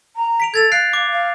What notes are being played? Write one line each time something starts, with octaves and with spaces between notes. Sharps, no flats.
A#5
B6 D7 F7
A4 G#6 A6 F7
F5 F#6 C7 D7
D6
F5